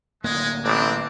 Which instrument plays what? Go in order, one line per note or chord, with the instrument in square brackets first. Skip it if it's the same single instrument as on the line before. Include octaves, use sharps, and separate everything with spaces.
[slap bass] D1 A#3 [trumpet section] G#3
[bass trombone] A1 [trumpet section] C4 [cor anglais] D4